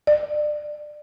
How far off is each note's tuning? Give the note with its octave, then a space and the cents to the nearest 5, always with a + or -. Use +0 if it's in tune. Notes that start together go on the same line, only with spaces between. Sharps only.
D5 +25